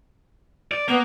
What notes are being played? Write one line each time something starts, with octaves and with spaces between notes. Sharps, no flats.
D5
A#3 B3